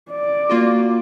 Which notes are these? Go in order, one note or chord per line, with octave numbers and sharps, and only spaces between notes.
D5
A#3 F4 F#4